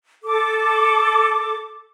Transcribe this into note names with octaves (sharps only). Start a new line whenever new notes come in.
A4 D6